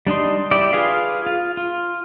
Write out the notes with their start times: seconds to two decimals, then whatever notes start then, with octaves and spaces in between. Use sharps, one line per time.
0.07 G3 D4 D#4 C6
0.51 E4 G4 D5
0.73 F4 G#4 B4 F5
1.27 F4
1.57 F4